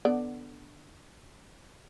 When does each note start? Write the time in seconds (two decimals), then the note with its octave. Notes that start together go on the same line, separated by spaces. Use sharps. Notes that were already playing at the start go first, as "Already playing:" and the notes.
0.05 D3 B3 D5